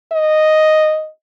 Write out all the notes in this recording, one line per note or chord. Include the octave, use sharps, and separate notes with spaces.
D#5